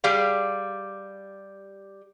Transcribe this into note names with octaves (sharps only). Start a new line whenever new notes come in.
G3 G4 G#4 F5